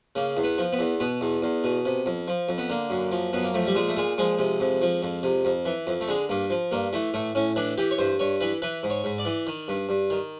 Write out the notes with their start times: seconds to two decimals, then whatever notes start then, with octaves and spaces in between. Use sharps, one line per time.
0.15 C#3 A#3
0.37 E2
0.44 B3
0.58 F3
0.73 B3
0.79 E2
1.00 B2 B3
1.21 E2
1.42 E2
1.64 B2
1.85 C3
2.06 F2
2.28 F3
2.49 F2
2.58 B3
2.70 D3 A#3
2.90 F#2
3.12 F3
3.33 F#2 B3
3.43 A#3
3.54 F3 A3
3.67 G3
3.75 A#2 G#3
3.89 A3
3.96 A#2 G#3
4.18 F3 G#3
4.39 C3
4.60 F2
4.82 F3
5.03 F2
5.23 C3
5.45 F2
5.65 E3
5.87 F2
6.01 A3
6.08 D3 G#3
6.29 G2 A#3
6.50 F3
6.71 G2 A#3
6.93 E3 A3
7.14 A2 A3
7.35 A2 C#4
7.56 E3 D4
7.78 E3 G4
7.91 C#5
7.98 G2 C5
8.19 G2 C#5
8.41 E3 B4
8.62 E3 B4
8.83 G#2
8.90 C#5
9.04 G#2
9.18 D5
9.25 E3
9.47 D#3
9.68 G2
9.89 G2
10.10 D#3